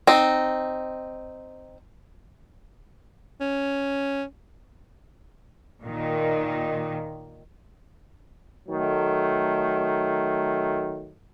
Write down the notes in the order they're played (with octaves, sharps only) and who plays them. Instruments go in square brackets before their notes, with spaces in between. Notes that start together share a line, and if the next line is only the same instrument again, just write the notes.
[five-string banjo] C4 D#4
[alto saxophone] C#4
[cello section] A#2 D#3
[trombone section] D#3 F#3 A3